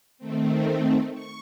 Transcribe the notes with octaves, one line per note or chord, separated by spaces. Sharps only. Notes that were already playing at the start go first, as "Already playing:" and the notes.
D#3 A3 C4
C#6